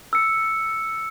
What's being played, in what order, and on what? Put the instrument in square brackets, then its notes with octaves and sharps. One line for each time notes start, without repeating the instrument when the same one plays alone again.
[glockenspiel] E6 C#7